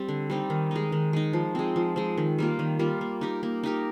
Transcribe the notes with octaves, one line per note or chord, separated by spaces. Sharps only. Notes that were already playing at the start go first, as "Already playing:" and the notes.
Already playing: G3 C4
D3
G3 C4 D#4
D#3
G#3 D#4
D#3
G#3 D#4
F3
G#3 C4
F3
G#3 C4
D#3
G3 A#3 F4
D#3
G3 A#3 F4
A#3
D#4 G4 A#4
A#3
D#4 G4 A#4